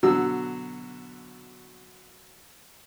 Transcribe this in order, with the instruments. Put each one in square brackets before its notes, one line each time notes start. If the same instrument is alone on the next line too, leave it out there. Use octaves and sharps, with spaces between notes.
[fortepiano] B2 D3 F#3 E6